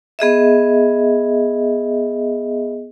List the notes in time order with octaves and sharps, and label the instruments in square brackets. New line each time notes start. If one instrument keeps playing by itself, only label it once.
[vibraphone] B3 G#4 D#5 E5